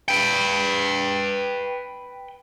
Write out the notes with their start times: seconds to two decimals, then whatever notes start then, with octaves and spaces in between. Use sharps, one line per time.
0.08 B4 G5